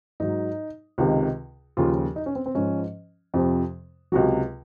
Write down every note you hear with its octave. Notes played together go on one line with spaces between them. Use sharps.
G#2 F#3 D#4
C#2 C3 D#3
D#2 C#3 F3 F4
D#4
C#4
C4
C4
G#2 F3 C#4
F2 C3 F3
C#2 C3 F#3 F#4